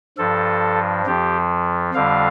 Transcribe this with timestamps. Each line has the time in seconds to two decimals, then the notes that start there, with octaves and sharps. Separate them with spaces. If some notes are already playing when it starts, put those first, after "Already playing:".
0.18 G2 F3 A4
1.06 F2 F3 G4
1.94 F2 D3 G3 F5